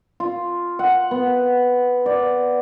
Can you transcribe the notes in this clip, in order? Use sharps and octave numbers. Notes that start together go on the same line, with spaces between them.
F4
F#5
B3
D5